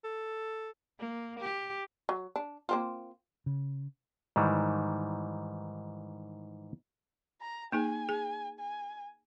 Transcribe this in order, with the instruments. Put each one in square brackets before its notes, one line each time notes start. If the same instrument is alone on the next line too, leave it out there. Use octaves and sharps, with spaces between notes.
[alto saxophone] A4
[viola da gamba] A#3
G4
[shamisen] F#3
D4
A#3 C4 F4
[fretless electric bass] C#3
[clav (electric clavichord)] G#2 D#3 E3 G3
[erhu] A#5
[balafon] A#3 D#4 G#4 [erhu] G#5
[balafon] G#4
[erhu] G#5